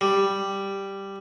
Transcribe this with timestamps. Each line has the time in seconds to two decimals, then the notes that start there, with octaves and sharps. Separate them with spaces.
0.01 G3